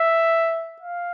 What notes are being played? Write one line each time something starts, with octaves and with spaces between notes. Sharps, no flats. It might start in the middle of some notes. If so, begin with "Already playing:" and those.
Already playing: E5
F5